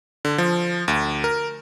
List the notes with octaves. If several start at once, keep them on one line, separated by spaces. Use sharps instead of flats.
D3
F3
D2
A#4